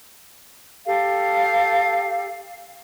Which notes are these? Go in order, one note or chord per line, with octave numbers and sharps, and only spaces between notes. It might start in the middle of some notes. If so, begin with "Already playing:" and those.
G4 A4 F5